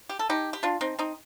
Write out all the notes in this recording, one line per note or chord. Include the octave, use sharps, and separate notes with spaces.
G4
A4
D#4 G4
G4
D4 F4
C4 D#4
C4 D#4